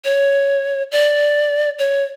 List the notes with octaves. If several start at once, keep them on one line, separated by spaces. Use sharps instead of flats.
C#5
D5
C#5